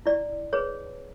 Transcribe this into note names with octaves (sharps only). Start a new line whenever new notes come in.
E4 D5
G#4 B4 C#5